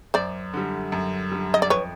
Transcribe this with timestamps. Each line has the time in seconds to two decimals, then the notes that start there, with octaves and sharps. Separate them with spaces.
0.14 F#2 C5 D5
0.53 D3 G3
0.92 F#2
1.31 D3 G3
1.54 D#5
1.62 D5
1.70 F2 B4 C#5